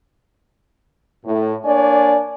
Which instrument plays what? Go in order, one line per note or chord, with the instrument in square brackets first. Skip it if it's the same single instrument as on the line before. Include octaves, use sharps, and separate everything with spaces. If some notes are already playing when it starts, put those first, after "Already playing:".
[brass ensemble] A2
A#3 D4 C#5 D5 G#5